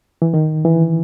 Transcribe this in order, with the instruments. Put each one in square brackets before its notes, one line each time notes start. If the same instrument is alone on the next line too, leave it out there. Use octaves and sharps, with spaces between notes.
[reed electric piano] E3
D#3
E3